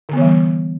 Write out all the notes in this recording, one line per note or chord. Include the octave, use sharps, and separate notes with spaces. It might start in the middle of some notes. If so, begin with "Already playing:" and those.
D3 E3 G3 B3